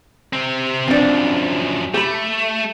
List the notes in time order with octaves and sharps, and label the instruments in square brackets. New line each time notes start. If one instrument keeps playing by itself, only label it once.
[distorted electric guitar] C3 C4
[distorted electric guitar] F#2 F3 [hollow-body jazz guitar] C4 D4
[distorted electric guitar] A3 [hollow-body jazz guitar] G4 B5